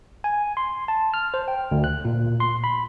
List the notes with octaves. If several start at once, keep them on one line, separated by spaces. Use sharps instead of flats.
G#5
C6
A5
F6
C5
G5
D2
F#6
A#2
C6
B5